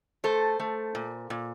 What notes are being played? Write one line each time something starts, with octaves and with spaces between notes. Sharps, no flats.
A3 A4 C5
A3
A#2
A#2